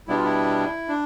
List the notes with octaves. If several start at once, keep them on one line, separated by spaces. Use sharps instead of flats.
B2 G3 B3 D4 E4
F4
E4
D4